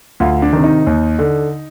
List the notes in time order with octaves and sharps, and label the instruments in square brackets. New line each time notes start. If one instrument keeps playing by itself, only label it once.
[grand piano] D2 F4
D4
C3 D#3
D#4
D#2
D3